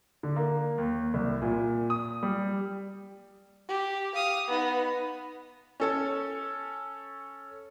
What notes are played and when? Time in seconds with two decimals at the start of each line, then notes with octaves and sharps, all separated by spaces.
0.23 D3
0.36 A#3
0.78 D#2
1.14 C2
1.42 A#2
1.90 D#6
2.23 G3
3.69 G4
4.15 F5 D#6
4.48 B3 D#4
5.80 C#4 A4 C#5